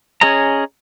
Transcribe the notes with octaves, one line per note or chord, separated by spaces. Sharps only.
C#4 G#4 C#5 D#5 A#5